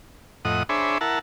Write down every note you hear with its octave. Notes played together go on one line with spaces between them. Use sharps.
F2 A2 D#5 F#5 D#6
D4 G#4 C5 C#5 E5 B5
E4 A#4 F#5 A5